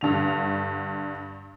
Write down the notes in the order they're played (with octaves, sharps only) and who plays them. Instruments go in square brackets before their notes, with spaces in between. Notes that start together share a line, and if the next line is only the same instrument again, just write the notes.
[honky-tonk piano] G2 D3 F7